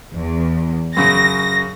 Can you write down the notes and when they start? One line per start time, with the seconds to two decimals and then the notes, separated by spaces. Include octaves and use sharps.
0.14 E2
0.96 F#2 C#3 A#6